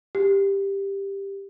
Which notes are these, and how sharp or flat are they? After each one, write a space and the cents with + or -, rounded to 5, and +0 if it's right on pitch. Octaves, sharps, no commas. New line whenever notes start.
G4 +10